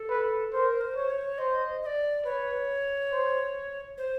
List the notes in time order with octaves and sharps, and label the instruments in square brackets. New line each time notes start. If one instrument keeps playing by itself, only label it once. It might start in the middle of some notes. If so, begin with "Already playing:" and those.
Already playing: [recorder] A4
[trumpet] B4
[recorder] A#4 [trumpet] C5
[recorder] C5
[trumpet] C#5
[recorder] C#5
[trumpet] C5 [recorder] D#5
[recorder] D#5
D5
[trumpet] B4 [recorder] C#5
[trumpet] C5
[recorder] C5